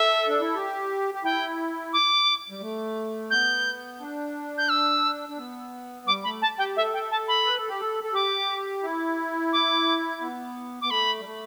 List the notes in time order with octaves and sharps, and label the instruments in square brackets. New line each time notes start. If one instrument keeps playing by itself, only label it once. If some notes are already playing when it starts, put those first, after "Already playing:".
Already playing: [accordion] A4 [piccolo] E5
[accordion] D4
E4
G4
G4
[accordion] E4 [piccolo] G5
[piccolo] D6
[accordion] G3
A3
[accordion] B3 [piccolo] G6
[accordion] D4
[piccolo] G6
E6
[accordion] D4
B3
[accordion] G3 [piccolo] D6
[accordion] A3 [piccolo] B5
[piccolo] A5
[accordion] G4 [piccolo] G5
[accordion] A4 [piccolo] E5
[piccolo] G5
A5
B5
[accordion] B4
A4
G4
A4
A4
[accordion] G4 [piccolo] D6
[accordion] E4
[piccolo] D6
[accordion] B3
[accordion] B3 [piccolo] D6
[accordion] A3 [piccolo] B5
[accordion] G3
A3